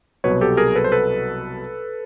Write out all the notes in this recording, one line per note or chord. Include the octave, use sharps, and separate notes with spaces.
C2 B2 F#3 B4 C#5
G4 A4
G#4 A#4
A4 B4
C5
A4 B4